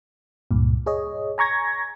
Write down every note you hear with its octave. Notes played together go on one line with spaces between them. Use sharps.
C#2 G2 A#2
G#4 C#5 D#5
G#5 A#5 C#6 G#6 A#6